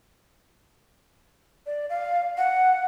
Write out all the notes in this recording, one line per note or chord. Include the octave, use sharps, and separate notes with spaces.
D5
F5
F#5